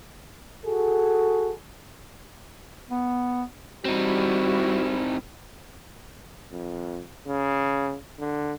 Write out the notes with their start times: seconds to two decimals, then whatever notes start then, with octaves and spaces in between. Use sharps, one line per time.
0.65 F#4 G#4 A4
2.91 B3
3.85 G3 C4 D#4 E4 F#4
6.51 F2
7.26 C#3
8.19 D3